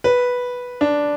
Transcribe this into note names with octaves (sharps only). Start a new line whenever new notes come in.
B4
D4